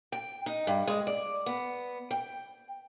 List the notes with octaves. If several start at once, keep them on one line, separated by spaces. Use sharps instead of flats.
G5
D#4
G2
G#3
D5
B3
G5